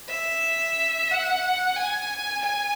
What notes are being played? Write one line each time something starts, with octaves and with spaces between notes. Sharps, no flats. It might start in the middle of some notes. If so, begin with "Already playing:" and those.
E5
F#5
G#5
G#5